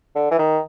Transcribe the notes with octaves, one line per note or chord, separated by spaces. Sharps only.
D3
E3
D#3